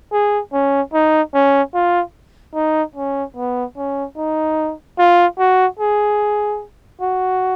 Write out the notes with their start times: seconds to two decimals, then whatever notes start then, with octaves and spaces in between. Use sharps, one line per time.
0.12 G#4
0.53 C#4
0.94 D#4
1.34 C#4
1.74 F4
2.55 D#4
2.96 C#4
3.36 B3
3.77 C#4
4.17 D#4
4.98 F4
5.39 F#4
5.79 G#4
7.01 F#4